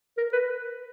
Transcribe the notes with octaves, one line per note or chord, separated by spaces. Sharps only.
A#4
B4